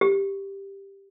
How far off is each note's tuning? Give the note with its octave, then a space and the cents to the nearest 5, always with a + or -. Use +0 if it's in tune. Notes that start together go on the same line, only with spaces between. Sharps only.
G4 +5